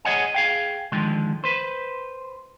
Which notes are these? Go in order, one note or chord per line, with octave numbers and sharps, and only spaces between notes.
G#4 C5 C#5 D#5 F#5 G#5
G#4 F5 G5
D3 D#3 F3 G#3
B4 C5